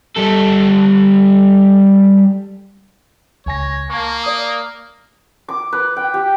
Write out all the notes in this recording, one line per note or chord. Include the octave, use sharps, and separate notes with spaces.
G3 A4
C#2 C#5 G#5 A#6
A#3 A5 C#6
D5 D#6
D6
B4
G5
G4